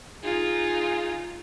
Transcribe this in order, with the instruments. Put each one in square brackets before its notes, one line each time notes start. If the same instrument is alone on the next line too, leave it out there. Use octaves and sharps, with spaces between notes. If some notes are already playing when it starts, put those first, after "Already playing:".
[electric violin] D#4 F4 [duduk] G#4